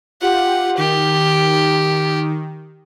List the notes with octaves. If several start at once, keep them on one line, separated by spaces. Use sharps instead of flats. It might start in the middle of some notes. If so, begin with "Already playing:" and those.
F4 G4 F#5
D#3 G4